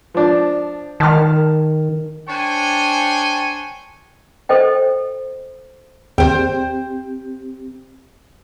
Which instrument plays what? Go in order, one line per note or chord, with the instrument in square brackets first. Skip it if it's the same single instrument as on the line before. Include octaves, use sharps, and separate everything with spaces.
[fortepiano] F3 D4
[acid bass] D#3 [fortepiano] A5 F6
[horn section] D4 C5 C#5 G5 G#5
[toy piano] A4 C5 D#5 G5
[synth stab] D#2 [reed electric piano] C4 G4 [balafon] G#4 [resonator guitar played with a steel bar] C5 G5